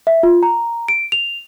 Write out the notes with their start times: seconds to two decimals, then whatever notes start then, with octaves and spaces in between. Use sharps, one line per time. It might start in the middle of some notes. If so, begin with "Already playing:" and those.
0.07 E5
0.23 F4
0.43 A#5
0.88 D7
1.12 F7